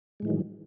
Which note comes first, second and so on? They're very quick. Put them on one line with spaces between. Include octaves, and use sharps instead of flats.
G#3 A2 E3 D#3 F#3